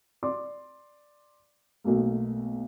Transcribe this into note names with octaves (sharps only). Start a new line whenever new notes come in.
D5 C6 D6
B1 B2 A3 A#3